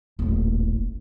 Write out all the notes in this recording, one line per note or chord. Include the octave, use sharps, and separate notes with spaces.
D#1 A1